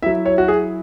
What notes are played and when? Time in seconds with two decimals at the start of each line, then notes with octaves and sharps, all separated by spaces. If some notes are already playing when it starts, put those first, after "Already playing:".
0.03 F#3 E4 E5
0.26 C#5
0.38 F#4
0.48 G#4